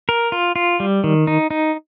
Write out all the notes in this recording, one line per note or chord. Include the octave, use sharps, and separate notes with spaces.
A#4
F4
F4
G3
D#3
D#4
D#4